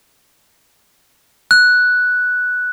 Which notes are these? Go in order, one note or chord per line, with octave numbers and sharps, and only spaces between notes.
F#6